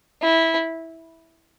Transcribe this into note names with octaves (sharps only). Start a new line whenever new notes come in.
E4